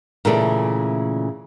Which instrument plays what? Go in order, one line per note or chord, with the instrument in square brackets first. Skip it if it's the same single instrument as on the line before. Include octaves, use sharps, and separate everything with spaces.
[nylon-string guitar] A#2 C#3 E3 A3 D5